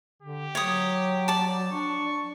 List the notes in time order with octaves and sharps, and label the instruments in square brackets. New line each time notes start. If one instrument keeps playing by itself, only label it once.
[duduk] D3 [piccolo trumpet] G4
[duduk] F#3 [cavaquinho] C#5 D#6
[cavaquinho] D5 A5
[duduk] D4 [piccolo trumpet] C#6